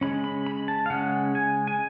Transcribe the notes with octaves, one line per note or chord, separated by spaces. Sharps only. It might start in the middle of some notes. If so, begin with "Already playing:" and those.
C#3 G#3 C#4 B5
B5
B5
A5
F5
C#3 G#3 C#4 F#5
G#5
G#5